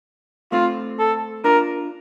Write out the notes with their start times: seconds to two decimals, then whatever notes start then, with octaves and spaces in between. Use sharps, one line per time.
0.52 A3 C4 F4
0.99 A4
1.44 D4 F4 A#4